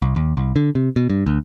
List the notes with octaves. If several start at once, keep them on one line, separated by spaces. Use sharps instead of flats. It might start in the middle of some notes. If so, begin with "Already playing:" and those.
C2
D#2
C2
D3
C3
B2
G2
D2